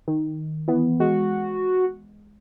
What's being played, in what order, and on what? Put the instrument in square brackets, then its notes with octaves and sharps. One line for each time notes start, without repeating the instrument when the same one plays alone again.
[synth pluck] D#3
E3 B3
[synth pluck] G#3 [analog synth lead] F#4